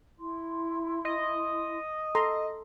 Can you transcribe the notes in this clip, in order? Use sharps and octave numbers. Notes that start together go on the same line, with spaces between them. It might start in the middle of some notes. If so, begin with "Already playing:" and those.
E4 C6
D#5
A4 A#5 C6